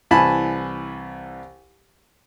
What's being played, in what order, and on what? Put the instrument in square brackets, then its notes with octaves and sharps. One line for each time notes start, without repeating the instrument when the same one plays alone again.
[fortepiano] C2 E3 G#5 A5 B5